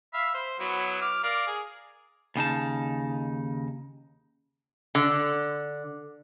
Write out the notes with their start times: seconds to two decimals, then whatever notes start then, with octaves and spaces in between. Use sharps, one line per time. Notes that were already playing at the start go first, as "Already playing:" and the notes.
0.14 E5 F5 B5
0.34 C5
0.60 F#3 B3 E4
1.01 D6 F6
1.23 A#4 D5 F5
1.47 G#4
2.36 D#2 C#3 D#4 A5
4.95 D3